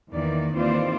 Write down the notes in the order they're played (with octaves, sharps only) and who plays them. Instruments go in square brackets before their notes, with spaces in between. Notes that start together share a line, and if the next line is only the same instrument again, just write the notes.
[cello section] E2 D#3 E3 A#3 D5
D#2 E3 C4 F4 C5 D5